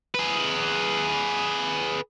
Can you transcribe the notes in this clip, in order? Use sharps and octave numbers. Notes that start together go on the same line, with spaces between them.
G#4 B4